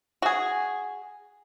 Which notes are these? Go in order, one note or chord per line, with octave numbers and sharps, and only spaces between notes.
F#4 G#4